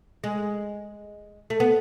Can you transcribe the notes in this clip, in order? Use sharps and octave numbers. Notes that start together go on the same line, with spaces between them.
G#3
A3
B3